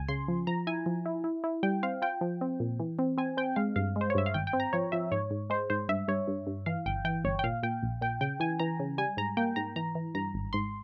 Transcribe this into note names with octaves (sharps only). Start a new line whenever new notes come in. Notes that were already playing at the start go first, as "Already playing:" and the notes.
Already playing: C#2 G#5
C#3 C6
F3
F3 A#5
E4 G#5
F3
E4
E4
E4
G3 G5
C4 F5
F4 G5
F3
C4
A#2
E3
C4
C4 G#5
C4 G5
G#3 F5
G2 F5
G#3
C5
C#5
G2 E5
F5
G#1 G5
G5
C4
A#5
F3 C#5
F3 E5
G#2 C#5
G#2
G#3 C5
G#2 C5
G2 E5
G2 C#5
G2
G2
E3 F5
G1 G5
E3 G5
G1 C#5
G5
A#2 F5
A#2 G5
A#1
A#2 G5
C#3 G5
E3 G#5
E3 A#5
C#3
G3 G#5
G#2 A#5
A#3 G5
G#2 A#5
E3 A#5
E3
G2 A#5
G#1
G#2 C6